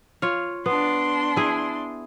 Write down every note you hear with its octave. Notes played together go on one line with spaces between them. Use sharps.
F4 C#5 F5
B3 D4 C6
E4 G#4